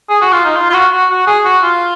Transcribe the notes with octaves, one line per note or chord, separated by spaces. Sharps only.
G#4
F#4
F4
D#4
F4
F4
F#4
F#4
F#4
G#4
F#4
F4